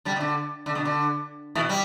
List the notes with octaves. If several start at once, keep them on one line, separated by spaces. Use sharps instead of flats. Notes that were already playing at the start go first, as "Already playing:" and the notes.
D3 G3
B2
D3
D3
B2
D3
B2 E3
G3